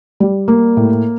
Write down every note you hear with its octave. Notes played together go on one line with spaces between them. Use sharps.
G3
A#3
A2